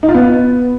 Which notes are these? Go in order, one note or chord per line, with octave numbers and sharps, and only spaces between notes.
D#4
F4
B3